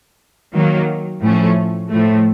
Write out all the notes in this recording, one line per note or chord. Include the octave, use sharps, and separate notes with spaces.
D#3 F#3 A#3
A2 F3 A3 C#4
A2 F3 A3